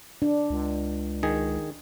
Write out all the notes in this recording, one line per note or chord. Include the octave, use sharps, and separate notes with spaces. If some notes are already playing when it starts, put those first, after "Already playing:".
D4
C#2
D#3 G#4